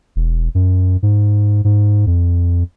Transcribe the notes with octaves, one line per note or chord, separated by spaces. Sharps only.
E1
F#2
G#2
G#2
F2